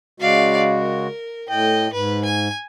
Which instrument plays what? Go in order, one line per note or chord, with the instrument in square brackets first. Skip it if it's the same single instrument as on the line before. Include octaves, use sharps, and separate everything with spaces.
[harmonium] C#3 G#3 F#4 [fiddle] D5 F5
[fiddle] A#4
[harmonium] A2 G5 [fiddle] D#5
[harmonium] G#2 [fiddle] B4
[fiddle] G#5